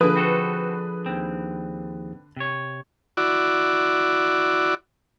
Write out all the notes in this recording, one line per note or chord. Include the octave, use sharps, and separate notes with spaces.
D3 F3 A#3 G#4 B4 D#6
C4 F#4 A4
D#2 C4
C3 C#5
E4 F#4 D5